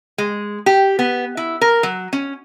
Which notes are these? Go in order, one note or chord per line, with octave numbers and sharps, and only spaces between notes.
G#3
G4
B3
E4
A#4
F#3
C#4